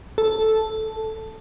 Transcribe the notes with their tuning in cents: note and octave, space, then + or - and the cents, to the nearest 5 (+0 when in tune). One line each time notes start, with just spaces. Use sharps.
A4 -5